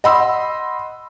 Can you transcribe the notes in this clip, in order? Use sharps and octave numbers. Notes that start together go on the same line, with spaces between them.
D#5 F#5 B5 C6 E6